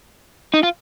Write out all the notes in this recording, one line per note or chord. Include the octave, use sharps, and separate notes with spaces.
D#4
F4